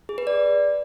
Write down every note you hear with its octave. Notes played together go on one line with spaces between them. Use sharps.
G#4
B4
D5